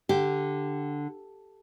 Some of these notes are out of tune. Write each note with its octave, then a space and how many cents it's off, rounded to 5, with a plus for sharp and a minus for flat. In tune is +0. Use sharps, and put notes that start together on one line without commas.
D3 +0 G4 +0